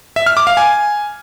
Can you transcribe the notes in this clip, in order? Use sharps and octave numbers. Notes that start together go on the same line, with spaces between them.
E5
F6
D6
F5
G#5